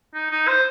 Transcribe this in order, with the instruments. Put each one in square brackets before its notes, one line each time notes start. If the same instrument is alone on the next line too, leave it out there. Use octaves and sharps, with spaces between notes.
[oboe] D#4
D#4
C5